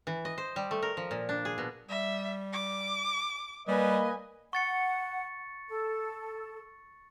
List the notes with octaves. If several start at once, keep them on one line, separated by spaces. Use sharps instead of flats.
E3
D#5
C5
G3
A3
A#4
F3
A#2
D4
G#4
B2
G3 E5
D6
G3 A#3 B4 D#5 G#5
F#5 C#6 A6 C#7
A4